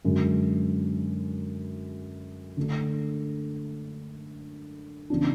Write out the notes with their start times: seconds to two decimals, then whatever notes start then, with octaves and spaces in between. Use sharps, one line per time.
0.05 F#2 D3 G#3
2.57 D3 A3 D4
5.10 C#3 E3 B3 D4